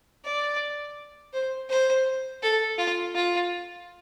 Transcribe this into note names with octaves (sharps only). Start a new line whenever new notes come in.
D5
C5
C5
A4
F4
F4